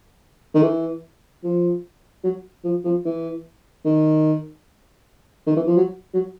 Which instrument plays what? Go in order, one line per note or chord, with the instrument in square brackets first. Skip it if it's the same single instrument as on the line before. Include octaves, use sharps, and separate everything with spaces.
[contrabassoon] D#3
E3
F3
F#3
F3
F3
E3
D#3
D#3
E3
F3
F#3
F#3